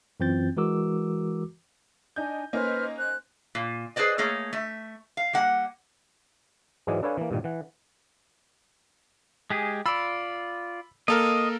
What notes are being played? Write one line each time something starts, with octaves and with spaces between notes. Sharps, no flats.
F#2 E3 C4 F4 G6 A6
E3 G#3 F#4 A#4 D6 E6
D4 D#4 G#5 G6
A#3 C#4 D#4 B4 C5 F6
C5 F#6
A#2
G#4 B4 C5 D5 D#5
A3 A#3 G#4 C#5
A3 E5
F5
G3 A#3 F#5
G#2 E3 F#3 G#3 D5 D#5
D4 A4 B4 C#5 F5 G#5
E3 A#3
G2 A#2 D#3
E3 F#5
G#3 G4 G#4
F4 D5 B5 E6
A#3 A4 A#4 D#5 F5